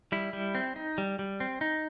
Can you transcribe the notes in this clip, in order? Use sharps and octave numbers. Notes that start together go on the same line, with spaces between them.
G3 E4
G3
C4
D#4
G3
G3
C4
D#4